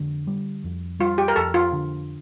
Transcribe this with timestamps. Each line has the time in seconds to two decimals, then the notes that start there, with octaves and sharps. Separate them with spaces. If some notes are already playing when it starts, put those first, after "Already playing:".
Already playing: F2 D3
0.27 G3
0.64 F2
1.00 G3 F4
1.18 G4
1.28 A#4
1.36 F2 A4
1.54 F4
1.73 D3